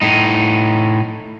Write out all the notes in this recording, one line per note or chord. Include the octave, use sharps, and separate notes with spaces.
A2 D#4